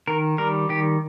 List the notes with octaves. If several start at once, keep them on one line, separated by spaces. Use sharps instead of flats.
D#3 A#4
G3 A#4
D#3 G4